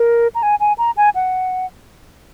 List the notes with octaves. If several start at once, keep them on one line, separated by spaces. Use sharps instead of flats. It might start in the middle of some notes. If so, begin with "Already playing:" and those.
Already playing: A#4
A#5
G#5
G#5
A#5
G#5
F#5